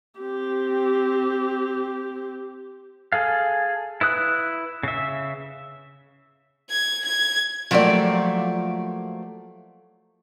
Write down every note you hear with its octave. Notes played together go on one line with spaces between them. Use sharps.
C4 G4
G#4 A4 F5
E4 B4 D#6 F#6
C#3 E5
G#6
G#6
F3 F#3 A3 A#3 G4 D5